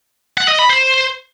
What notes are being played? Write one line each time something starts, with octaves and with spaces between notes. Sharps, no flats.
F#5
D#5
B5
C5